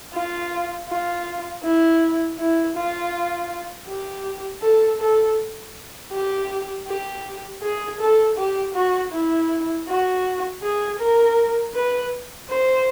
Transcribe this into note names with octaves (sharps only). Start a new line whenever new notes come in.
F4
F4
E4
E4
F4
G4
A4
A4
G4
G4
G#4
A4
G4
F#4
E4
F#4
G#4
A#4
B4
C5